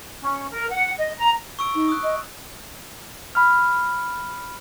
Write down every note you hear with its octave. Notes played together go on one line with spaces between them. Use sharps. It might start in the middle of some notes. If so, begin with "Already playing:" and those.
C#4
A#4
F#5
D#5
A#5
C#6 E6 D7
D#4
D#6 F#6
D#5
B5 F6